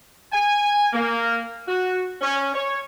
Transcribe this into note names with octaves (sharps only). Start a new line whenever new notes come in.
G#5
A#3
F#4
C#4
C#5